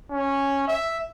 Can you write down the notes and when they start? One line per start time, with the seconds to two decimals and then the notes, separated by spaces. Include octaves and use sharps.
0.11 C#4
0.68 E5